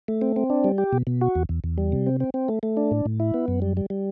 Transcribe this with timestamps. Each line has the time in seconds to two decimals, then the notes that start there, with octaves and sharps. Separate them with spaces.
0.08 A3
0.22 C4
0.36 C4
0.50 D4
0.64 G3
0.78 G4
0.93 B2
1.07 B2
1.21 F#4
1.35 E2
1.49 E2
1.64 E2
1.78 G3
1.92 C3
2.06 C4
2.20 C4
2.34 C4
2.48 A3
2.63 A3
2.77 D4
2.91 A2
3.06 A2
3.20 E4
3.34 B3
3.48 F#2
3.62 G3
3.77 G3
3.90 G3